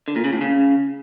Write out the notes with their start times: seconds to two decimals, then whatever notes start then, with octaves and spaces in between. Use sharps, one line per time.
0.08 D3
0.16 A#2
0.24 C#3
0.33 A2
0.41 C#3